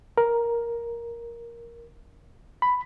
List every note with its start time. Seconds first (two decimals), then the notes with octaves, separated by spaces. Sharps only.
0.18 A#4
2.62 B5